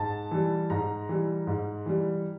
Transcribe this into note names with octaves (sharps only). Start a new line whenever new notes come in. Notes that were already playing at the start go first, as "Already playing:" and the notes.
Already playing: G#2 A5
E3 G3
G#2 A#5
E3 G3
G#2
E3 G3